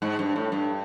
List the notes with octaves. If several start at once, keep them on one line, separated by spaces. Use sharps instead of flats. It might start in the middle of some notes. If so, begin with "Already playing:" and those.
G#2
G2
A2
G2